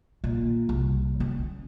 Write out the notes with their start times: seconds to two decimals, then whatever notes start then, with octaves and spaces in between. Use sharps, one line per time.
0.24 A#2
0.69 C2
1.20 C#4